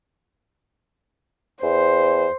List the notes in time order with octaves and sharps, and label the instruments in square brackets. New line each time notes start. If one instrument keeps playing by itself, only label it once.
[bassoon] E2 [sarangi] C5